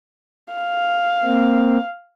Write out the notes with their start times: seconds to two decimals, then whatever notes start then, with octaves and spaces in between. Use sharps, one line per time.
0.54 F5
1.24 A#3 C4